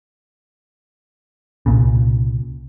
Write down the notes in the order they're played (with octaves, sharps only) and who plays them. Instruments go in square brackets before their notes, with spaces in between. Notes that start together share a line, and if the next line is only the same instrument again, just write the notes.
[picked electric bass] C2 A#2 C#3